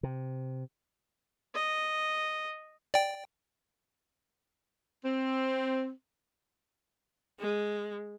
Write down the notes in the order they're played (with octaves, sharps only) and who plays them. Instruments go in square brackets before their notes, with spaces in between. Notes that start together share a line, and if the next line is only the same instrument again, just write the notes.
[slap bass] C3
[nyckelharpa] D#5
[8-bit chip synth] D5 G5
[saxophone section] C4
[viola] G#3